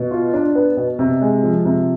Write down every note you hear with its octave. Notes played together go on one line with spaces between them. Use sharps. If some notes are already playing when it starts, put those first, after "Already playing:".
Already playing: B2
F4
D4
B3
B2
C3
G#3
F3
C3